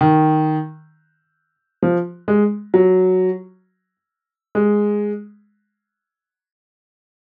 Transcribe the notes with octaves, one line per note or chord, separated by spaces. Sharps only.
D#3
F3
G#3
F#3
G#3